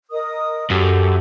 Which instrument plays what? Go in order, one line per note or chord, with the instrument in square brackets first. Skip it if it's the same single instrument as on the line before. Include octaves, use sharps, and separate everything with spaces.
[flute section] A#4 D#5 D#6
[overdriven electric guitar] F#2 [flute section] G4 A4